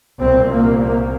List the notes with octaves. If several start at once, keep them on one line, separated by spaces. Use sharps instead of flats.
C2 A#2 C4
A#3
A#3